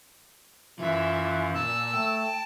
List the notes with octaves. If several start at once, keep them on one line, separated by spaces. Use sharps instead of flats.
F#2 E3 F4 E5
A#2 A5 E6
A3 G5